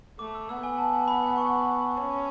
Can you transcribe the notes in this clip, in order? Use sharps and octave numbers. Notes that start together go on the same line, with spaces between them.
A3 D6
E6
B3 E6
G#5
A5
B5
C#6
C#4